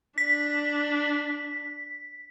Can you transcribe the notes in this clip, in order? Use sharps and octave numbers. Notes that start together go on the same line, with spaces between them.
D4 B6